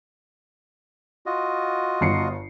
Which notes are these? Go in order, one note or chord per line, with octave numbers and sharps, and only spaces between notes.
F4 F#4 D#5
G1 C7 C#7